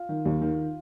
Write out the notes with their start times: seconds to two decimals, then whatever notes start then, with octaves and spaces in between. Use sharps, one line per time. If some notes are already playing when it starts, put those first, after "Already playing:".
Already playing: F4
0.09 D#3
0.25 D#2
0.41 D#3